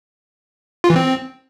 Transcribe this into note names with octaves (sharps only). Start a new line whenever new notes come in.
F4
E3
C4